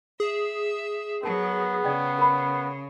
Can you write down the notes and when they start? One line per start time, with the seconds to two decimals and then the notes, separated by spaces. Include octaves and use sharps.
0.20 G#4 E5
1.23 F#3 B3 A#4 A5
1.84 C#3 D5 G5
2.18 A#4 B5